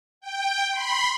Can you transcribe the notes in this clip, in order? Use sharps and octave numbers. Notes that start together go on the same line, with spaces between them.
G5
B5 C6